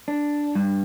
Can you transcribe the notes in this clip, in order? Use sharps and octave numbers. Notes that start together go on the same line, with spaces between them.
D4
G2